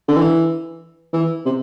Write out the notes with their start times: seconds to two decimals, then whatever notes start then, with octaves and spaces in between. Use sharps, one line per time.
0.08 D3
0.17 E3
1.13 E3
1.45 C3